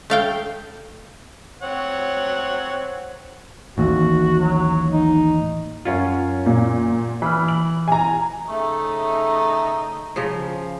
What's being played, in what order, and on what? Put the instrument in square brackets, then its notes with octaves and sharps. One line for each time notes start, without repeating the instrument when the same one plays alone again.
[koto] A3 F5 G5
[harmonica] C4 C#5 F#5
[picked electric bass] A1 D#2 [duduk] F#4
[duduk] F#3
D#4
[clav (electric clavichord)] F#2 C#4 F4
[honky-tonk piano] A#2
[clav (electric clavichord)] E3 [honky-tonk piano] B5 F6
[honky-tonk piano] F#7
G#5 A#5
[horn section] C#3 A3 [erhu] D#4
[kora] C#3 F3